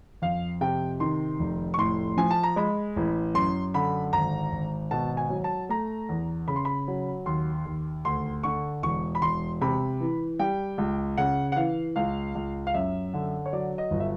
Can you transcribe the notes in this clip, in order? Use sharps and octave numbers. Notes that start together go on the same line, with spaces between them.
F2 F5
C3 G5
D#3 C6
F1
C#6
A2 C6
F3 G#5
A5
A#5
G#3 B5
A1
F#2 C6
D3 B5
G#1 A#5
G#1
B2 A5
G#5
F#3
A5
A3 A#5
E2
C#3 B5
C6
B5
F#3
D#2 C6
D#2
D2 C6
D3 C#6
E1 C#6
B5
E1 C6
C3 B5
E3
G3 G5
C#2
C#3 F#5
F#5
E3 F5
C#2 F5
C#2
F5
F#2 E5
D3
C#5
F#3 D5
D#5
G1
E5